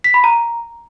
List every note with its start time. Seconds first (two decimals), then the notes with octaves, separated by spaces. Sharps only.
0.04 B6
0.14 B5
0.24 A#5